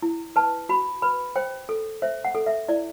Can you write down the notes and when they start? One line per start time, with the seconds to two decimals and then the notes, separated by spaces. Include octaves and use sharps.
0.03 E4
0.36 B4 A5
0.69 F#4 B5
1.02 B4 B5
1.36 C5 G5
1.69 A4
2.02 C5 E5
2.25 F#5
2.35 A4
2.46 E5
2.68 E4 D5